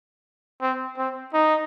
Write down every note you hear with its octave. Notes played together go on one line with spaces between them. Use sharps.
C4
C4
D#4